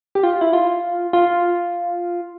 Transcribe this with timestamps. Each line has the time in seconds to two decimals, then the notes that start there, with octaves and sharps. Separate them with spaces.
0.15 G4
0.23 F4
0.41 E4
0.53 F4
1.13 F4